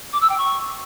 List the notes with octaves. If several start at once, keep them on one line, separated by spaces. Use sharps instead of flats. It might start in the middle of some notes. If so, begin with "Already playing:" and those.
D6
E6
G5
C#6